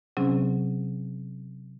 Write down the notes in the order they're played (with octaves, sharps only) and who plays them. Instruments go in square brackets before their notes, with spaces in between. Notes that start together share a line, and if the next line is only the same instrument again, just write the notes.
[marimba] C3 F#3 C4 C#4 G#4